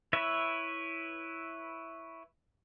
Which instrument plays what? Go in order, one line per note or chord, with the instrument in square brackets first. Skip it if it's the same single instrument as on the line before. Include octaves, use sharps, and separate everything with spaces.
[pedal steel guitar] E4 B4 C#5 E5